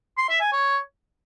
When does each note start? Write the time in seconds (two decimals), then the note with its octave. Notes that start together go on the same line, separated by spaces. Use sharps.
0.18 C6
0.29 E5
0.41 G#5
0.52 C#5